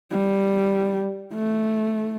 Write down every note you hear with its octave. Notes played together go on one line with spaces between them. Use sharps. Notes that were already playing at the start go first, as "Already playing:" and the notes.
G3
A3